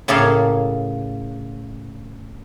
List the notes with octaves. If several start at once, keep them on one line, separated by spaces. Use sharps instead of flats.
A2 C#3 A#3 G#4 A4 F5